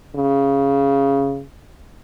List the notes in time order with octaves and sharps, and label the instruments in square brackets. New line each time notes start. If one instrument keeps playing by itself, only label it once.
[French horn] C#3